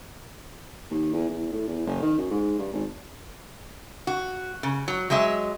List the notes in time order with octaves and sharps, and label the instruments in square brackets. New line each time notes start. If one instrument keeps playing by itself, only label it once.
[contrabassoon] D#2
E2
E2
A2
E2
F#1
D#3
F#2
G#2
G2
G#1
[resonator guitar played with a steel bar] F#4
C#3
F#3
F#3 G#3 D#5 E5